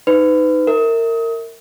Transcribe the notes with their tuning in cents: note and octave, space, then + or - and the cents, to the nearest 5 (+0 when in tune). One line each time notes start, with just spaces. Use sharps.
D#4 +0 B4 +35
A#4 -25 E5 -25